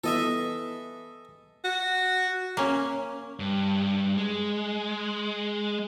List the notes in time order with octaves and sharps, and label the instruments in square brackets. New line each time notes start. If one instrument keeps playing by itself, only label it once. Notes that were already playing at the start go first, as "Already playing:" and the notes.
[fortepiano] E3 B3 [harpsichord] A4 D#5 E5
[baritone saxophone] F#4
[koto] A#3 C#4
[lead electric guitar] G2
G#3